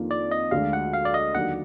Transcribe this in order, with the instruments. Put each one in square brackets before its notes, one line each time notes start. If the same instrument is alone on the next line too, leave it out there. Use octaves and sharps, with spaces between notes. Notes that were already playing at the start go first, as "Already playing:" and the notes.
Already playing: [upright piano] F2 D#3 A#3 D4 F4
[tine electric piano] D5
D#5
[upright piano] D2 D3 G#3 D4 [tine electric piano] F5
[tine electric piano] F#5
F5
D5
D#5
[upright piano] D#2 D3 F#3 D4 [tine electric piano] F#5